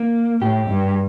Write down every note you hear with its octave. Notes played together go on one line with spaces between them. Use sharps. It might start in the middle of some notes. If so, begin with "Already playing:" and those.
Already playing: A#3
A2 G4
G2